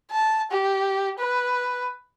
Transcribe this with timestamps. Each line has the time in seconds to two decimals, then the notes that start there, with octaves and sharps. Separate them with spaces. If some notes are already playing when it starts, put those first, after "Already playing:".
0.11 A5
0.51 G4
1.18 B4